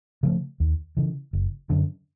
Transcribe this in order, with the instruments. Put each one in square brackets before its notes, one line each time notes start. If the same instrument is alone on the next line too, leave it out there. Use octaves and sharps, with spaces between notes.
[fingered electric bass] C#3 F3 A3
D#2
C#3 E3
F#1
F#2 D3